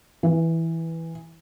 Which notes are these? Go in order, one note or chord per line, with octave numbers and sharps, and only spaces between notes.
E3